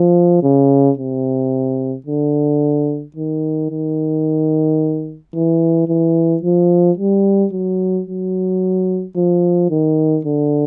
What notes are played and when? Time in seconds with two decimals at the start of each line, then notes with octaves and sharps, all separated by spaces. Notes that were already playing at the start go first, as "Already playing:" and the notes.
Already playing: F3
0.43 C#3
0.98 C3
2.06 D3
3.16 D#3
3.70 D#3
5.35 E3
5.88 E3
6.43 F3
6.98 G3
7.52 F#3
8.07 F#3
9.16 F3
9.70 D#3
10.25 D3